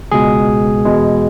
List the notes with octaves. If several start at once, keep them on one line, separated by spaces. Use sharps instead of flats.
C#2 B2 G#3 G#4
E2 B2 G#3